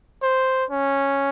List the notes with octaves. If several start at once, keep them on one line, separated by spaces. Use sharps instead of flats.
C5
C#4